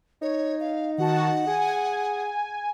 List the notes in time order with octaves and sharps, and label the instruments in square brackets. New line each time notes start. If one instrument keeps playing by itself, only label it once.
[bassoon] D#4 [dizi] C#5
[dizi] F5
[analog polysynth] D#3 F#4 A5 [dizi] F#5
[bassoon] G#4 [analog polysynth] G#5